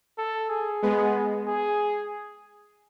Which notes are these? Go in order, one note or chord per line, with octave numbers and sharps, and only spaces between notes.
A4
G#4
G#3 B3
G#4